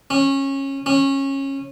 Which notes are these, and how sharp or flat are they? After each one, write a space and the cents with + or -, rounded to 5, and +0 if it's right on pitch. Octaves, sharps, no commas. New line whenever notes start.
C#4 -20
C#4 -20